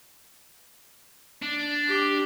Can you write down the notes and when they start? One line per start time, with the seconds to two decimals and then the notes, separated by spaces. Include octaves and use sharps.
1.43 D4
1.88 G4